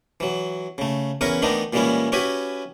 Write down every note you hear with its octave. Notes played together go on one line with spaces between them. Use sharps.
E3 F#3
C#3 A3
E2 C#4 E4 A#4 B4 C#6
D#3 E3 A3 B3 D4 D#4
A#2 E3 G3 G#3 C#4 E4
C#4 E4 F#4 G4 B4 G#5